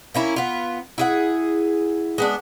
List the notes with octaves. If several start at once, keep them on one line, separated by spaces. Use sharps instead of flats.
A#3 C#4 E4
B3 F4
E4 G#4 F#5
G#3 B3 D4